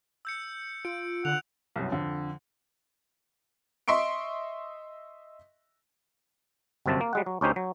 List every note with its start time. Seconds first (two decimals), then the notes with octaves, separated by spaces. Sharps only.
0.25 E6 G6 C#7
0.85 F4 D7
1.25 D3 F#5 F7
1.76 C2 F#2 B2
1.92 F2 D3
3.88 D#5 E5 C6 C#6 D7
6.86 G1 F#2 C3 C4 A5
7.01 A#3
7.13 G3 G#3 F#5
7.26 F#3
7.41 D2 C#4 D#4 G4 C5
7.56 F#3